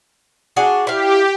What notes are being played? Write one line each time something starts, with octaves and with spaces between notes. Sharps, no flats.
D4 F#4 G#4
E4 G4 F5